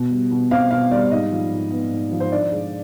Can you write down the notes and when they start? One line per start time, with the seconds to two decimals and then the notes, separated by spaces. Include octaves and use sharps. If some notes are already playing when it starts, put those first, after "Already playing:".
Already playing: B2
0.11 G3
0.31 B2
0.51 C4 F5
0.71 B2 F5
0.91 G3 D5
1.11 G#2 D#5
1.32 F3
1.52 G#2
1.71 B3
1.91 G#2
2.11 F3
2.20 C5
2.32 D3 D5
2.52 G#3